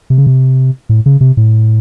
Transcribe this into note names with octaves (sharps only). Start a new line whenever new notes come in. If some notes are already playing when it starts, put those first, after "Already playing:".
C3
C#3
C3
A2
C#3
C3
A2